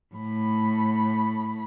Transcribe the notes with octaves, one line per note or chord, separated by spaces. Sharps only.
A2 B5